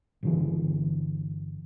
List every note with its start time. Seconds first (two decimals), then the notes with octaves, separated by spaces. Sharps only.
0.23 G1 D3 E3